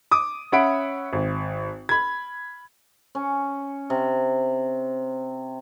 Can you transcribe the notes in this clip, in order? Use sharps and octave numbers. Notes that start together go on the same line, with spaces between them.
D6 D#6
C#4 E5 F#5 B5 D7
G#1
B5 G#6
C#4
C3